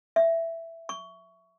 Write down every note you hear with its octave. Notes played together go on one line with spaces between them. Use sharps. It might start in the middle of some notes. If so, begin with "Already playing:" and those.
E5
C#6